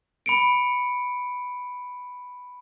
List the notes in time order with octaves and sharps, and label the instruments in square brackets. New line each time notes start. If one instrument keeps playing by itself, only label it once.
[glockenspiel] B5 C#7 D7